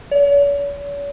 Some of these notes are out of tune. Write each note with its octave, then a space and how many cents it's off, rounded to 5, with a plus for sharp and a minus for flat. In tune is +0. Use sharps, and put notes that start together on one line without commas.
C#5 +45